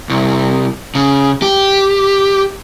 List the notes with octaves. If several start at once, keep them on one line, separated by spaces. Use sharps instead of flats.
C2
C#3
G4